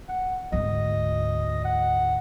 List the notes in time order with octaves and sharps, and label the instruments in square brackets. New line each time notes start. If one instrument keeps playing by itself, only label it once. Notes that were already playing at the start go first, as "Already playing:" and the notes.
[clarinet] F#5
[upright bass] D2 G#2 [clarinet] D#5
[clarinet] F#5